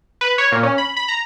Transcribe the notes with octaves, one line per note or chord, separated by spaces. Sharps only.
B4
C#5
A#2
C#4
B5
B5
A#5